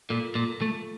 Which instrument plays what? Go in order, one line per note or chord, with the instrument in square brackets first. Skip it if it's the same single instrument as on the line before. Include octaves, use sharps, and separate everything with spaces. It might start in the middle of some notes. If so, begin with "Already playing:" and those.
[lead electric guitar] A#2 [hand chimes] F4 A4
[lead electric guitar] A#2
A3